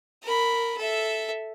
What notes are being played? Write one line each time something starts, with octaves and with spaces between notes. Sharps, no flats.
A#4 B5
A4 E5